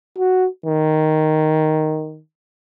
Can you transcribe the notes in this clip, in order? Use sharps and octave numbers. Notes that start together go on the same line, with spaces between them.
F#4
D#3